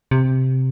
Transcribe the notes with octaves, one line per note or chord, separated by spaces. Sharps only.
C3